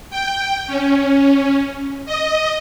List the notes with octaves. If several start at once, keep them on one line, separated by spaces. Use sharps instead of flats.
G5
C#4
D#5